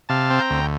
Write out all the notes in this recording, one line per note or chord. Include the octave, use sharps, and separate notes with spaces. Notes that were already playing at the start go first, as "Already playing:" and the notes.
C3 F5 A5
C4
G5 A#5
D2